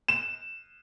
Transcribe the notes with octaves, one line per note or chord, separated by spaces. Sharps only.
E7